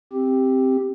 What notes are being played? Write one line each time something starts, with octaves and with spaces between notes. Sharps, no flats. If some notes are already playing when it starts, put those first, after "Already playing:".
C4 G4